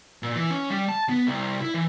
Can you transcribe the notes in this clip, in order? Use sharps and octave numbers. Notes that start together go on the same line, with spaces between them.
A#2
E3
C#4
G3
A5
B3
C2
E4
E3